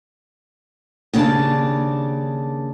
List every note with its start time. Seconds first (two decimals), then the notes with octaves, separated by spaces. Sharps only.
1.13 D#2 C#3 B3 D4 D5 A5